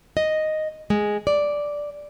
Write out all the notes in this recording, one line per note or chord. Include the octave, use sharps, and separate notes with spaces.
D#5
G#3
D5